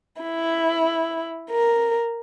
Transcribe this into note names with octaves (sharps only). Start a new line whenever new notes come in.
E4
A#4